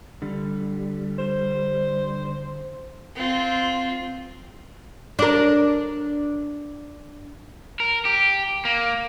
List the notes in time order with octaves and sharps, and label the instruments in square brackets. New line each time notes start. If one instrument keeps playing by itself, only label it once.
[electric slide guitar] D3 G3
[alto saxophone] C5
[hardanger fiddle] C4 F4
[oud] D4 A#4
[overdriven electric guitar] A#4
G4
A#3